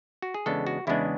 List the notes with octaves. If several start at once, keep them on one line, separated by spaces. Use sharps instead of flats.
F#4
G#4
E2 C#3 G#3 B3 D4 A4
F#4
E2 C#3 G#3 B3 D4 E4